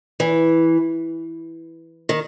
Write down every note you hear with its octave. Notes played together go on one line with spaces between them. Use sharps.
E3
D#3